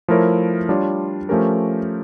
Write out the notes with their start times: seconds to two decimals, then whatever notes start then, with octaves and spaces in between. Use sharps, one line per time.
0.08 F3 A3 E4 A#4 C#5
0.69 G3 D4 F4 C#5
1.29 F3 A3 C#4 G4 A#4